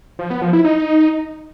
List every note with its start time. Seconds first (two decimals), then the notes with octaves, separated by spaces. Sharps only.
0.19 F3
0.30 B3
0.42 F3
0.53 E4
0.64 D#4